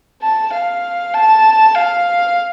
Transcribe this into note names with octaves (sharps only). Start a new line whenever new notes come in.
A5
F5
A5
F5